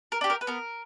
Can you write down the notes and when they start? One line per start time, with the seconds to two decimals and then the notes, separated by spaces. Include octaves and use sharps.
0.12 A#4
0.21 D4 G4
0.30 A#4
0.41 B4
0.47 B3 A#4